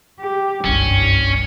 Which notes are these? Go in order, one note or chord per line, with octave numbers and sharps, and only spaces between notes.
G4
F#1 C2 G2 C#4